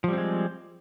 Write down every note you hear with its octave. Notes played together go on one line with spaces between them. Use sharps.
F3 G3 G#3 C4